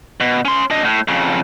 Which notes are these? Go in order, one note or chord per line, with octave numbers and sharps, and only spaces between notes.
B2
C#4 C6
D4 D#5
A2
F2 C#3